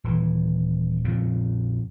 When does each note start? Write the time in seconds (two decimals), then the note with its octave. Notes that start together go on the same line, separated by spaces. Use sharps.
0.04 D#1 E3
1.04 F2 A#2 C#3